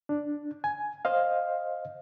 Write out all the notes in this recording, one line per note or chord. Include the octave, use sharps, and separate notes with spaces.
D4
G#5
C5 D#5 F5